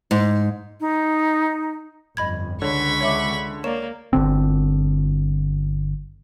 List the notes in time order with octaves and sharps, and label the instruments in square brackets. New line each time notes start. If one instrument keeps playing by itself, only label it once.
[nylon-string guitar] G#2
[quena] D#4
[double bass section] G1 F2 [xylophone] D#5 B5 G#6
[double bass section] C#2 G#3 [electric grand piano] D3 [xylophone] C#5 [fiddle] B5 C#6
[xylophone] C#5 E5 D6
[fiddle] A#3 [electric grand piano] C#5 D5 [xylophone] E7
[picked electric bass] G1 D3 C4